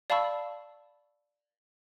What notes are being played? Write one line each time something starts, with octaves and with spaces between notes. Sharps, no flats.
D5 F5 A5 B5 C#6 E6